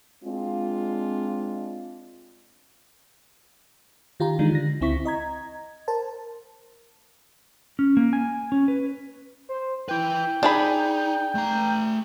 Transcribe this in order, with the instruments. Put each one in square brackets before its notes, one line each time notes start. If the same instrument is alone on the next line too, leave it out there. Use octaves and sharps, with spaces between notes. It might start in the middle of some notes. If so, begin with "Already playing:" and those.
[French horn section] G#3 C4 D4 F4
[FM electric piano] D#3 F4 G4 A#5
D#3 E3 G#3 D4 D#4
D3 A#6
C#2 C4 E4 C#6 B6
D#5 A#5 G#6
A#4 C5 A5
[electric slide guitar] C#4
A#3
G#5
C#4
B4
[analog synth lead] C5
[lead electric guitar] E4 B4 [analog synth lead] G5
[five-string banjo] D4 G#4 B5 [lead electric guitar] D#4
[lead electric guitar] A3 A#5